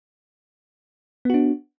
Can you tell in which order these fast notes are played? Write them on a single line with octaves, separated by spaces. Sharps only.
B3 F#4 D4